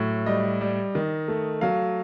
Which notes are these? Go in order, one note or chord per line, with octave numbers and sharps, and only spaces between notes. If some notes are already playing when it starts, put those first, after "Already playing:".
Already playing: A2 F#3
G3 D#5
G3
D#3
A3
F#3 F5